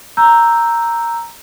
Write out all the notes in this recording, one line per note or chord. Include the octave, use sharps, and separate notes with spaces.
A#5 E6 G6